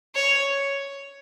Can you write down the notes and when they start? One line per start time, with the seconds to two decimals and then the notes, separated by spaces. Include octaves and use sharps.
0.15 C#5